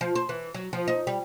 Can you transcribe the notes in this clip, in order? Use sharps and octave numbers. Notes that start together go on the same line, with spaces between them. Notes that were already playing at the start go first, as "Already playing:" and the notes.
F3
C5
E3
F#3
F3
D#4
G3